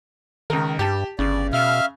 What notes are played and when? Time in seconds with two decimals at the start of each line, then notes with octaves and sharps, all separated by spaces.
0.50 C#2 D#3 A#4
0.79 G2 G4 A5
1.19 G1 C#3 D5
1.53 B2 E5 F5 F6